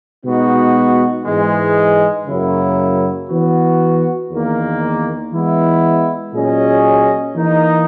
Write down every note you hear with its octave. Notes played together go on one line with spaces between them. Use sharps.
B2 G#3 B3 D#4 F#4
G#2 E3 G#3
F#2 C#3 F#3 A#3 E4
E3 B3 F#4
E2 D#3 A#3
E3 G#3 B3 E4
A#2 F#3 C#4 G#4 D#5
E3 A#3 D#4